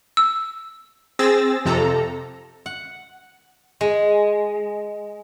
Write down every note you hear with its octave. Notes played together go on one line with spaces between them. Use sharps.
E6
C4 G#4 E6 A6 A#6
F2 C3 A4 A#5
F#5
G#3